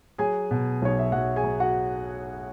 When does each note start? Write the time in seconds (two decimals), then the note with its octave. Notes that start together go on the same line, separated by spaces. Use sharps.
0.18 F#3 G#4 G#5
0.51 B2
0.82 B1 C#5
0.99 E5
1.12 B1 F#4 F#5
1.36 G#4 G#5
1.44 F#3
1.60 F#4 F#5